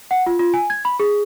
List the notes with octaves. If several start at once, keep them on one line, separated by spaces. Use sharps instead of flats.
F#5
F4
F4
G#5
G#6
B5
G#4